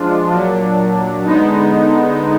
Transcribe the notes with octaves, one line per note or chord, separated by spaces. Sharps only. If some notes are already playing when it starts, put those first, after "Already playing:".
Already playing: F3 G#3 D4 F4
A#2 F#3 D4
D3 G#3 B3 D#4